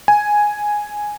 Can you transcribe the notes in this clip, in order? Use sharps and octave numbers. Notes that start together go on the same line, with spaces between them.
G#5